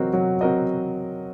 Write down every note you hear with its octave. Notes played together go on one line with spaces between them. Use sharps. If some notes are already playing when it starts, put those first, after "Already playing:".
Already playing: F#3 C4 F#4 A#4 D#5
F#3
C4 F#4 A#4 D#5